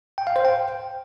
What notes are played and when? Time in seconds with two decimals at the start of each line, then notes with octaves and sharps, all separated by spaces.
0.18 G5
0.27 F5
0.36 C5
0.45 G5